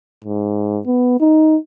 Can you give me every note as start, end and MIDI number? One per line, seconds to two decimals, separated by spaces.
0.24 0.81 44
0.86 1.19 59
1.20 1.57 63